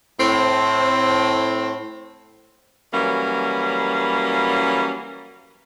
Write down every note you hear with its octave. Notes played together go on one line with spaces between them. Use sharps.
A2 C4
E3 F#3 G3 A#3 C#4